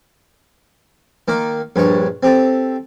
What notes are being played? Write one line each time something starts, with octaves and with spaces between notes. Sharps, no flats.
D#3 A#3 D6
A#1 G2 C#5 C#6
C4 G4 A4